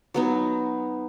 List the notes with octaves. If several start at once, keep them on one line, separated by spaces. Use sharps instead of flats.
F#3 B3 D#4